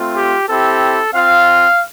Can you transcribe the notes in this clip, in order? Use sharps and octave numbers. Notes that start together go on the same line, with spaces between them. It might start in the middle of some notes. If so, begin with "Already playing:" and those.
Already playing: A3 C4 F4
G4
C4 E4 G4 A4
C4 F4 F5